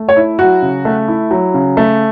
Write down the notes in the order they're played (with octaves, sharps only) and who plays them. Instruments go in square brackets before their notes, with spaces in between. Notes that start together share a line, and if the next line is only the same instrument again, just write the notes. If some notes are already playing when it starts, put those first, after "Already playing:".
Already playing: [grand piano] A3
[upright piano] C#5
[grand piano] E4
[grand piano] F#3 [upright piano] F#4
[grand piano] C#3
A3
E4
F#3
C#3
A3